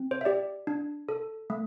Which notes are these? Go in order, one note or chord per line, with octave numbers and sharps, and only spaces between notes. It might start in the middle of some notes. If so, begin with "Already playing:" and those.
Already playing: C4
C5
E5
G4 D5
D4
A4
A3